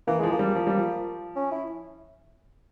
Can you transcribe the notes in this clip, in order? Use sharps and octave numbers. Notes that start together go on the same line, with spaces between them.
E3 A#3
F3 G#3
A#3
G3
F3
G3
F3
C#4
E4